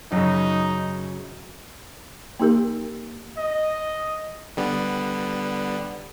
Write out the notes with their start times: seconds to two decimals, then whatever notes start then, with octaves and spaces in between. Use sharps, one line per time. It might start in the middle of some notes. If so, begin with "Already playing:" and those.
0.12 F#2 C#3 F#3 D#4
2.39 A#3 D#4 G4 A#4
3.38 D#5
4.57 D3 G3 B3